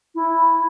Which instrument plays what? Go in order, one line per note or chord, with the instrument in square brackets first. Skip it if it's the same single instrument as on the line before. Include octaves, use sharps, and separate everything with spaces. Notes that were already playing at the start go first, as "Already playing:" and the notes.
[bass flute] E4